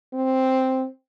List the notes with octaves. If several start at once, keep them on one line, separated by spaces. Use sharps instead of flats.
C4